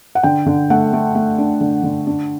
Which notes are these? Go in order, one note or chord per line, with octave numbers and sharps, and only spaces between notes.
F#5
D3 G5
D3
A3 F#5
A3
A3
D4
D3
D3
D4